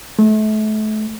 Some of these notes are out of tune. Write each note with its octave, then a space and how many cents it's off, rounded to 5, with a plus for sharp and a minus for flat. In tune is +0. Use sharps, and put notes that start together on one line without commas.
A3 -35